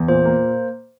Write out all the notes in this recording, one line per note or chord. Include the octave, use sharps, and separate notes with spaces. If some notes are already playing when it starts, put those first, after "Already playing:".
Already playing: E2
A#2 C5
A#3